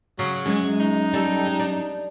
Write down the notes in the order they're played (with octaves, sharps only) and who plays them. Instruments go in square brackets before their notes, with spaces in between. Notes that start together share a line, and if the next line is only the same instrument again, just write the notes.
[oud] C#3 [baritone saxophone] F#3
[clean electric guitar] F#2 [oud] G#3
[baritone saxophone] D#4
[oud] G3 A4
G#3
D4